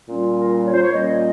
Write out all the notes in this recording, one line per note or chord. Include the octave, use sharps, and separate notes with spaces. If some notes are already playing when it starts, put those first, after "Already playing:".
A#2 G3 C#4 F4
A#4
C#5
C5
C#5
A#2 G3 A#3 C#4 F4 D#5